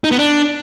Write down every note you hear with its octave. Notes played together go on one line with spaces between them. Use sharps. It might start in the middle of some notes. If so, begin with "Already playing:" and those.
D#4
B3
D4